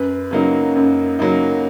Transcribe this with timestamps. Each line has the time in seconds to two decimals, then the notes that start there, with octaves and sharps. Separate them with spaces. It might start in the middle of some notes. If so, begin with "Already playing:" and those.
Already playing: F#2 B4
0.31 C#3 F#3 A#3 D#4
0.75 F#2
1.19 C#3 F#3 A#3 D#4